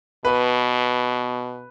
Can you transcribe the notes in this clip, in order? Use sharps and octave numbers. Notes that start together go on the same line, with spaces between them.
B2 B4